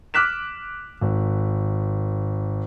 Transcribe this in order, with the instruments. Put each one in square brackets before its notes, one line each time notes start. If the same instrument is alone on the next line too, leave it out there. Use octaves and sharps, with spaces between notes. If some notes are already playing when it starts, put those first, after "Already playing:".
[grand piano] D6 F6 F#6 B6 E7
G#1